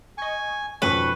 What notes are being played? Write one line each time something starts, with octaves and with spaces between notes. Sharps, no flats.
D#5 G#5 C#6
F2 G#2 B2 F3 C#4 B4 C#6